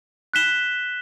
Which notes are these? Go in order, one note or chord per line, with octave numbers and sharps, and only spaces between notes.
F#6 B6 E7 G7